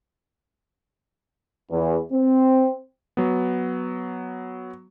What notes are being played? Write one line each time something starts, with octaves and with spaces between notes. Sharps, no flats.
E2
C4
F#3 B3